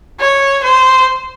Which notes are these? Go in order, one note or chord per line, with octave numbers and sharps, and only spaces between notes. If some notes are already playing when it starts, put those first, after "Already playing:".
C#5
C5